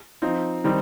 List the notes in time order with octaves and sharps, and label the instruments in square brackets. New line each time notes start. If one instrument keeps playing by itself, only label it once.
[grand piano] F3 C4 D#4
D#3 G3 C4 D#4